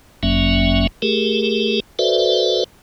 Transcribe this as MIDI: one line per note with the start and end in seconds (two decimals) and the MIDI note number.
0.23 0.87 31
0.23 0.87 42
0.23 0.87 54
0.23 0.87 58
0.23 0.87 61
0.23 0.87 76
1.02 1.80 57
1.02 1.80 67
1.02 1.80 68
1.02 1.80 70
1.99 2.64 66
1.99 2.64 69
1.99 2.64 71
1.99 2.64 72
1.99 2.64 74
1.99 2.64 76